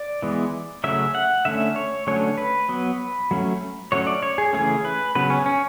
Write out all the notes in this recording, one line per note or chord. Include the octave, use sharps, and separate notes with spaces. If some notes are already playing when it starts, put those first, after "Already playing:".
Already playing: D5
E3 G#3 B3
C#3 F#3 A3 C#4 E5
F#5
D3 A3 C#4 E5
C#5
D3 F#3 A3 C#4 C#5
B4
F#3 B3
F#3 A3 C#4
F#3 A3 C#4 C#5
D5
C#5
G#4
C#3 E3 A3 C#4 G#4
B4
C#3 F#3 B3 B4
C#4
C#4